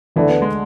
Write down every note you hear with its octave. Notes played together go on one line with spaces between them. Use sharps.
D2 D3 E3 A3 D4 A4
B3
G#3